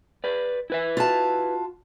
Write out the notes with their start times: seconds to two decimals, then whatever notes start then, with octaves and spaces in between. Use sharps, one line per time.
0.24 B4 D5
0.70 E4 B4 E5
0.97 F4 F#4 A5